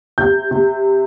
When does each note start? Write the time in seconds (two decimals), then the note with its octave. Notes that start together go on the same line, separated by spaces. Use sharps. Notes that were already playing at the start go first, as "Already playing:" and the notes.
0.18 C3 G6
0.51 C3